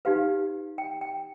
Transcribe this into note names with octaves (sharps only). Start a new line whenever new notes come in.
D#4 G4 B4 F5
G5
G5